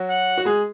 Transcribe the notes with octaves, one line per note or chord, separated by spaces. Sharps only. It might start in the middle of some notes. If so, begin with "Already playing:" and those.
Already playing: F#3 F#4
F#5
F#4
G#3 G#4